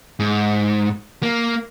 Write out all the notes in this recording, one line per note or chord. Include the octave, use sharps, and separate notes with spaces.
G#2
A#3